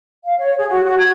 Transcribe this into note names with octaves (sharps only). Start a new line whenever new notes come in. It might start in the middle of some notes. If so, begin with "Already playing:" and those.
F5
C#5
G#4
F#4
F#4
G#6